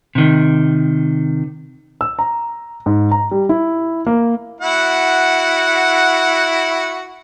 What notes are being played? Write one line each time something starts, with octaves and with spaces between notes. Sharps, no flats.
C3 D#3
E6
A#5
G#2
A#5
G3
E4
A#3
E4 F#4 F#5